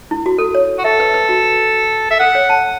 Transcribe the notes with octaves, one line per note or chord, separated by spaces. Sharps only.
E4
F#4
A4
C#5
F#4
A4 E5
B4
B4
F#4
E5
A4 F#5
C#5
A5